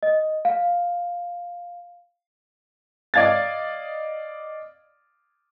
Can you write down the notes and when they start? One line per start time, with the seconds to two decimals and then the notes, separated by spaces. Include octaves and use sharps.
0.03 D#5
0.45 F5
3.14 D5 D#5 F5 G#6 A6